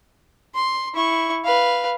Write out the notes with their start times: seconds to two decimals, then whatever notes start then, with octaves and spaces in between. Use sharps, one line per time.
0.54 C6
0.94 E4 C#6
1.45 B4 F5